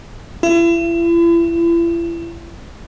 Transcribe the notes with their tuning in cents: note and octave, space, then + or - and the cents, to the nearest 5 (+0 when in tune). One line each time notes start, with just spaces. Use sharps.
E4 +40